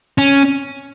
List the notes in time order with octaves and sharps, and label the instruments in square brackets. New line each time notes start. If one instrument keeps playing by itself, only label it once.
[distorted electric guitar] C#4